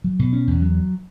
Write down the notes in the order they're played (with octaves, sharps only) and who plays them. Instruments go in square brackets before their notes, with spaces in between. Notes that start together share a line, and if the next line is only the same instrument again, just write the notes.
[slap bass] F#3
B2
C#4
E2
F#3